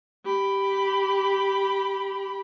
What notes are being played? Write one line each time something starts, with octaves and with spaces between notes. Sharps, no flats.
G4 B5